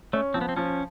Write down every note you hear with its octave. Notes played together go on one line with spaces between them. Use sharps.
A3 C#4
F3 C4
B3
C4
F3 C#4